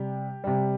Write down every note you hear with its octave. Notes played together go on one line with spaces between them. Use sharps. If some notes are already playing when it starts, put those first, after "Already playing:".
Already playing: C3 G3 G4
C3 G3